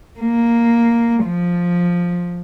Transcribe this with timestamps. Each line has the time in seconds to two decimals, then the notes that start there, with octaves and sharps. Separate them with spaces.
0.20 A#3
1.25 F3